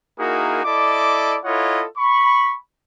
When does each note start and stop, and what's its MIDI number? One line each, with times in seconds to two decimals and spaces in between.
0.18 0.61 58
0.18 0.61 63
0.18 0.61 64
0.18 0.61 66
0.18 0.61 68
0.18 0.61 70
0.65 1.38 64
0.65 1.38 69
0.65 1.38 74
0.65 1.38 75
0.65 1.38 86
1.45 1.84 64
1.45 1.84 65
1.45 1.84 69
1.45 1.84 73
1.45 1.84 75
1.45 1.84 78
1.98 2.57 83
1.98 2.57 85